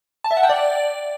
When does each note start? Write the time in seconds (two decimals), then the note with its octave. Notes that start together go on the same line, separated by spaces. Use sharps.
0.24 A5
0.31 E5
0.37 F#5
0.43 G5
0.49 D5